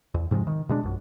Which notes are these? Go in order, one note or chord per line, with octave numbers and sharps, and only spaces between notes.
E2
G#2 C3 F3 G#3
D#3
B2 G#3 D4
A#1 F#2